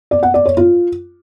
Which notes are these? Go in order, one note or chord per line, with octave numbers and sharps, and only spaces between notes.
D5
F#5
D5
C#5
F4